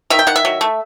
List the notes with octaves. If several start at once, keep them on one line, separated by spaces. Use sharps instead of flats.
D#3 E5
G5
D#3 F#5
E5
F#3
A3